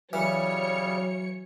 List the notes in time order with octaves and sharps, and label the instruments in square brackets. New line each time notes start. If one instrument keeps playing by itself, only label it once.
[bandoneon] C#3 G3 F6 [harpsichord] E3 [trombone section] F#3 [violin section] C#5 C#7